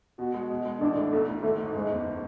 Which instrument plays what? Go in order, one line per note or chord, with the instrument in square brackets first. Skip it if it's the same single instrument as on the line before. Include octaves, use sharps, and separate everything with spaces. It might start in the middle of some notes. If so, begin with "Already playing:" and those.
[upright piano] B2 [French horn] F#4
[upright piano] G#3
B2
G#3
[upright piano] A1 [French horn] D4
[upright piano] A2
[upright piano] B1 [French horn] A3
[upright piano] A2
[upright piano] G#1 [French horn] A3
[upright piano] G#2
[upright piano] F#1 [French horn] G#3
[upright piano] E2